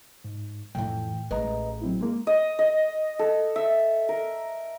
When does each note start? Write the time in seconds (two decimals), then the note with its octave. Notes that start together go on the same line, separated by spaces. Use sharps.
0.24 G#2
0.75 F2 A2 E3 G5
1.31 A1 G#3 B4 D#5 A#5
1.81 F#3 C4 E4
2.01 G#3 A#3
2.27 D#5
2.59 D#5
3.19 A4
3.56 E5
4.09 A#4